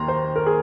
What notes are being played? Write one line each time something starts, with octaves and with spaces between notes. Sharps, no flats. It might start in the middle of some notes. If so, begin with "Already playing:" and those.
Already playing: D#2 D#3 A#3 A#5 C6
C5
A#4
G#4